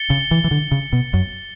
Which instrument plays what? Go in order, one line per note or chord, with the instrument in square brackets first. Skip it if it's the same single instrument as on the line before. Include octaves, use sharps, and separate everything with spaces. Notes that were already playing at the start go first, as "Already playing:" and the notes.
Already playing: [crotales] A6 C#7 G7
[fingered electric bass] C#3
E3
E3
D3
C#3
B2
F#2